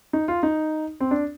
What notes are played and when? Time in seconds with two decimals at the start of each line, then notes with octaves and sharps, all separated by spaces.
0.13 D#4
0.28 F4
0.43 D#4
1.00 C4
1.11 D4